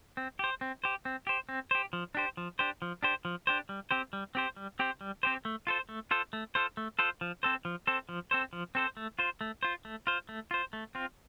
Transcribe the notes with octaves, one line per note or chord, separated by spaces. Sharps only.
C4
G4 C5
C4
G4 C5
C4
G4 C5
C4
G4 C5
F3
D4 G4 C5
F3
D4 G4 C5
F3
D4 G4 C5
F3
D4 G4 C5
G3
C4 G4 C5
G3
C4 G4 C5
G3
C4 G4 C5
G3
C4 G4 C5
A3
F4 A4 C5
A3
F4 A4 C5
A3
F4 A4 C5
A3
F4 A4 C5
F3
C4 A4 C5
F3
C4 A4 C5
F3
C4 A4 C5
F3
C4 A4 C5
A3
F4 C5
A3
F4 C5
A3
F4 C5
A3
F4 C5
A3
C4 F4